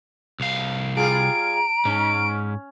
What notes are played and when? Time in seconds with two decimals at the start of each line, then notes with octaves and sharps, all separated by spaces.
0.40 C2 F5
0.96 G3 F4 G#4 A#5 D7
1.85 G#2 C#4